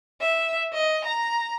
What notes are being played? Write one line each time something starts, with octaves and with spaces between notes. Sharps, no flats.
E5
D#5
A#5